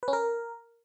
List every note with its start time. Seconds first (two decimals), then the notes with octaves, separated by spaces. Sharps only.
0.03 B4
0.08 C#4
0.13 A#4